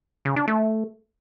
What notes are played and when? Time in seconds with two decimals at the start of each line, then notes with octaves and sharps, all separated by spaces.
0.25 C#3
0.36 D4
0.48 A3